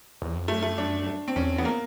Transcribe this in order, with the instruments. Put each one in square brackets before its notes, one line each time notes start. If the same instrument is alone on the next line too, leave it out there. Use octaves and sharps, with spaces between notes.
[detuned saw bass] E2
F2
[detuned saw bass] F#2 [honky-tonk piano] A3
[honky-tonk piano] A3
D4
C4
[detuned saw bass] E2 [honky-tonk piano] C#4
[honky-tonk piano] B3
A#3